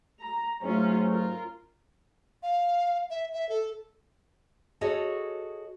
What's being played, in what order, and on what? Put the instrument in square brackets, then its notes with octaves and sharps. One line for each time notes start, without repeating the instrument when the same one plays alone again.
[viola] A#5
[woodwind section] G#2 F#3 A3 [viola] C#4 F4
[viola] F4 A#4
[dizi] F5
E5
E5
A4
[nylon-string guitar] F#4 G#4 A4 C#5 D#5